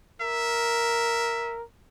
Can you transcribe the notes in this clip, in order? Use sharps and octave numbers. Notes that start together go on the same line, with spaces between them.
A#4 E5